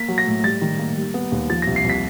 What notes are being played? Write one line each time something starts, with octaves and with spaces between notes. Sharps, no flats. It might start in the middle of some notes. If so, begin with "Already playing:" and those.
Already playing: A#3 B6
F#3
A#6
A2
G3 A6
D#3
A#3
G3
B3
D#2
F3 A6
C2 A#6
C7
C2
B6